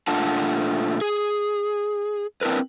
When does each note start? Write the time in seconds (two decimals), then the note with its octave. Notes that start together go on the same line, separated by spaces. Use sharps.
0.07 A#2 A3 D4 F4 F#5 A5
1.01 G#4
2.41 C4 D4 E4 A#4 B4